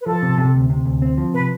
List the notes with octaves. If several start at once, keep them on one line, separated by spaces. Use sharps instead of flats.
B4
F3 A4
C3
C3
D2
C3
D2
C4
F3
C3 B4